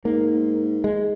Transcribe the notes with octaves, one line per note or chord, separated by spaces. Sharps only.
G#2 A#3
G#3